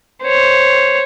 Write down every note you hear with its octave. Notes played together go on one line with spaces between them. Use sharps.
C5 C#5